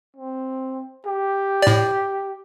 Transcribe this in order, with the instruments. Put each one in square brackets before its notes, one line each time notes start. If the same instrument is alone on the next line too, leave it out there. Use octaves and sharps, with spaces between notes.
[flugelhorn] C4
G4
[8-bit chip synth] A2 D5